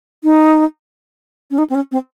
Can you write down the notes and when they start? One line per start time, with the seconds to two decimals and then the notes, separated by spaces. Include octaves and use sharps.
0.24 D#4
1.51 C#4
1.58 D#4
1.70 C4
1.75 C#4
1.92 C4